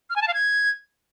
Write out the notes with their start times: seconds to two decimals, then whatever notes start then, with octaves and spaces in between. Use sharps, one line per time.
0.10 F6
0.16 G#5
0.22 A5
0.28 F5
0.34 G#6